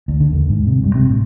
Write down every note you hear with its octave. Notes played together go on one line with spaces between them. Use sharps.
D2
D3
D#2
G#2
C3
G2
C3
A2